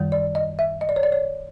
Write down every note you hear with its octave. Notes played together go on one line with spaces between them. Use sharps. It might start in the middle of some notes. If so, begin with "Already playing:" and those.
Already playing: F#2 D#3 G3
D5
D#5
E5
D#5
D5
C#5
D5
C#5